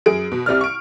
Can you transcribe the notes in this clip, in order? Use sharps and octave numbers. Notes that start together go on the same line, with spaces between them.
F#2 G#4 D7
B2
C2 C3 D5 F6
C#6 D7